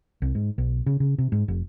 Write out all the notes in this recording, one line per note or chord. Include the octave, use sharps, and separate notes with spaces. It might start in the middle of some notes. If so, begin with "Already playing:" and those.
C2
G#2
B1
C#3
C#3
C3
G#2
F1